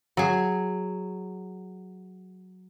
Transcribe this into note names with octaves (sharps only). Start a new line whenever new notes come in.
F#3 G#4